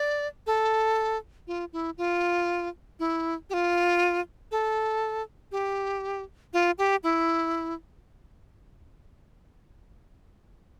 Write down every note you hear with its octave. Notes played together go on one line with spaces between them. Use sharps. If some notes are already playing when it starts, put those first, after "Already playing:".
Already playing: D5
A4
F4
E4
F4
E4
G4
F4
A4
G4
F4
G4
E4